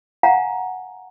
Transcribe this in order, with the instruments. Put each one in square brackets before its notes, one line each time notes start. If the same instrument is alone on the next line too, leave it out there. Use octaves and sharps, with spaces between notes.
[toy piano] F5 F#5 G#5 A#5